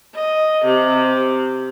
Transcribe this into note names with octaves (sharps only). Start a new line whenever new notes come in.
D#5
C3